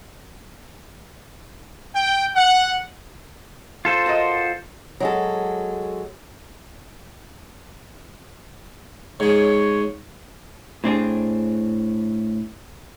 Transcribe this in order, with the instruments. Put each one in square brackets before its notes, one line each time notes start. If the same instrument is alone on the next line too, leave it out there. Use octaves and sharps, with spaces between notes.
[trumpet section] G5
F#5
[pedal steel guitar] F4 A4 C5
[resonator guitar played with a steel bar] F#4 A#4 D#5
[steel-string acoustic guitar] F#3 G#3 A4
[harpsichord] G#2 G#3 [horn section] C#5
[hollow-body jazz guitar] A2 C4 D4 G#4